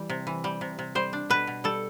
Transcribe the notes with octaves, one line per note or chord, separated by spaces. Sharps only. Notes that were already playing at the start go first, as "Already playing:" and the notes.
Already playing: E3 G3
C3
E3
G3
C3
C3
G3 C5
D4
B2 B4
B2
G3 A4